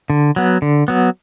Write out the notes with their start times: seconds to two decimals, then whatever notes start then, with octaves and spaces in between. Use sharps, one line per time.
0.10 D3
0.36 F#3 B3
0.62 D3
0.88 F#3 B3